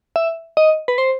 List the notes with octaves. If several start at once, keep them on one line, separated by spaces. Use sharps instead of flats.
E5
D#5
B4
C5